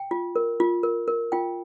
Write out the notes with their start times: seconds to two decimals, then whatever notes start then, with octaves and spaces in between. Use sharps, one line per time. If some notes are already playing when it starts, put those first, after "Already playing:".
Already playing: G5
0.11 F4
0.36 A#4
0.60 F4
0.83 A#4
1.08 A#4
1.32 F4 G5